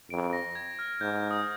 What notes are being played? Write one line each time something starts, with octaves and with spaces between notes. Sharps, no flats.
F2 D7
A#6
G#6
F6
G#2 G6
G6
D#6